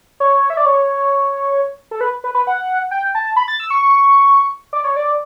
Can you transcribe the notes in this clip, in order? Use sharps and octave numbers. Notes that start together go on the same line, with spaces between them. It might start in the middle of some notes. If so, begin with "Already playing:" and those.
C#5
E5
D5
C#5
A4
B4
B4
B4
F#5
G5
A5
B5
A6
E6
C#6
D5
C#5
D5